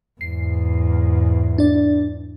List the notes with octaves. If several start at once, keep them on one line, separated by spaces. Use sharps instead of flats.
E2 G#2 C7
D4 D5